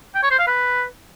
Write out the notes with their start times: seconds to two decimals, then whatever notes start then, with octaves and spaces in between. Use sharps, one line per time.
0.15 G5
0.23 C#5
0.31 C5
0.39 F5
0.47 B4